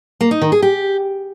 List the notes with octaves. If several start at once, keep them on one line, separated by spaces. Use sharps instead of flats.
A#3
D#4
D#3
G#4
G4